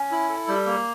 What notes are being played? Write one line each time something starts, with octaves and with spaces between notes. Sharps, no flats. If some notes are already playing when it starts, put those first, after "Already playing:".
Already playing: C#4
E4
A4
G3
A#3